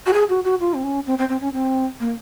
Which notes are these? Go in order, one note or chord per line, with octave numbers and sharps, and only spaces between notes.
F#4
G#4
F#4
F#4
F4
C4
C#4
C4
C4
C4
C#4
C4
A#3